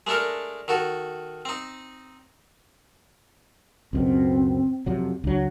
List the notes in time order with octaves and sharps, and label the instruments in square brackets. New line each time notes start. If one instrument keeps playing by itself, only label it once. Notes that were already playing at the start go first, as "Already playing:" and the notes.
[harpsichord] G#3 A3 D4 A4 A#4
D#3 F#4 A4
C4 D#4
[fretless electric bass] C#2 F#2 B2 [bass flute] C4
[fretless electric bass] F2 C3 F#3
[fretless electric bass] C#2 F#3 [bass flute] D4